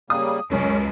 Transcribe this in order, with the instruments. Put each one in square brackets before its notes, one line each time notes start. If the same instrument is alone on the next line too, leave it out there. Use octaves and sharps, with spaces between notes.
[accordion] C#3 G3 A#3 [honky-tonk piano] D#6
[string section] C#2 [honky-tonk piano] F#2 [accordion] C#4